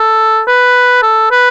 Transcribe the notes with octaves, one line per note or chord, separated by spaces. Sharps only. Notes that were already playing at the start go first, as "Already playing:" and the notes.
Already playing: A4
B4
A4
B4